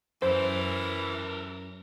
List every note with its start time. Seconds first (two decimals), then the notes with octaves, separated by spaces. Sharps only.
0.22 F#2 E3 A4 A#4 C5